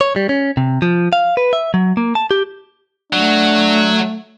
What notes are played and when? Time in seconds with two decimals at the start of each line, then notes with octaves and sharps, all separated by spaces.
0.01 C#5
0.16 G3
0.29 C#4
0.57 C3
0.82 F3
1.13 F5
1.37 B4
1.53 E5
1.74 F#3
1.97 A#3
2.15 A5
2.31 G4
3.13 F#3 A3 D4